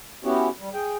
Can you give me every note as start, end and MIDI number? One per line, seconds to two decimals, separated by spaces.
0.24 0.49 59
0.24 0.49 61
0.24 0.49 64
0.24 0.49 66
0.24 0.49 67
0.59 0.69 55
0.74 0.97 68
0.74 0.97 79